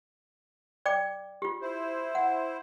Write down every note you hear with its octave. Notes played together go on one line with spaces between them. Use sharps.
D5 G5 D6
F4 G4
E4 C5
F#5